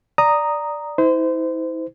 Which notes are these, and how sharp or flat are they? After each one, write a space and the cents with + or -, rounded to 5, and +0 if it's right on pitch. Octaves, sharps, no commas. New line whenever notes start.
D5 +0 A#5 +0 D#6 -5
E4 -40 C5 -30